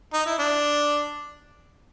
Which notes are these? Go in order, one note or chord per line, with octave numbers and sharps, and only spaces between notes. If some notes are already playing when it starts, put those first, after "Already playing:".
D#4
E4
D4